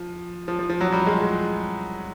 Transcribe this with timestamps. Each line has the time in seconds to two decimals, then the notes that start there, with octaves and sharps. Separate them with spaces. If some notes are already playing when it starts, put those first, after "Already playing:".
Already playing: F3
0.48 F3
0.59 F3
0.70 F3
0.81 F#3
0.92 G3
1.06 G#3